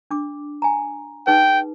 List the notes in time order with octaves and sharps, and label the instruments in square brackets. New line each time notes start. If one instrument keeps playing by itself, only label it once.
[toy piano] D4 D6
G#5 A#5
[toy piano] D#4 G#4 B4 [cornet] G5